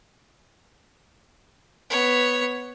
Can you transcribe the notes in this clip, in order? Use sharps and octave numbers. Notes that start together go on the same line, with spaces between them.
B3 C#5